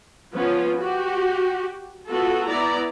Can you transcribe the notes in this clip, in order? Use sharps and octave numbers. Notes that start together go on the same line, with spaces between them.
F3 B3 C#4 F4
F#4 G4
B3 F4 F#4 A4
B3 E4 D5 A#5